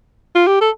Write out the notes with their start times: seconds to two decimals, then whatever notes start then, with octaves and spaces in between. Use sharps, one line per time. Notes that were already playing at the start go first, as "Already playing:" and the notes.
0.35 F4
0.47 G4
0.61 A4